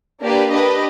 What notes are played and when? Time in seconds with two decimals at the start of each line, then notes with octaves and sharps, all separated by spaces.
0.21 A#3 D4 G4 B4 D5
0.52 D4 G4 B4 D#5